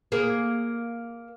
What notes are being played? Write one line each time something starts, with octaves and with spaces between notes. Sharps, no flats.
A#3 G#4